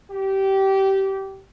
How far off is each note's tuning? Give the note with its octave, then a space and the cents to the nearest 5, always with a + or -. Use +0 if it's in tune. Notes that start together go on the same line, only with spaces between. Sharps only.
G4 -20